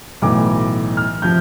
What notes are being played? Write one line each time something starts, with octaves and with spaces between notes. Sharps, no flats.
B1 A2 E3 D6
F6
C3 F3 C4 G6